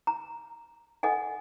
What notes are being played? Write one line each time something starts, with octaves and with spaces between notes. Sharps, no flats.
A#5
A4 D#5 F#5 G#5